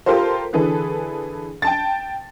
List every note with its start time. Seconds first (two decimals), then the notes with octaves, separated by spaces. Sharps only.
0.06 F4 G4 A4 A#4 C5
0.53 D3 E3 G#4 A4 B4
1.62 G5 A5 A6